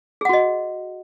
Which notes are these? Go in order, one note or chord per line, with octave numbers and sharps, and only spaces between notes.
F#4 G#4 D#5 F#5